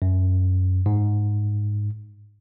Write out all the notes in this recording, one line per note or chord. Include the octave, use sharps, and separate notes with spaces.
F#2
G#2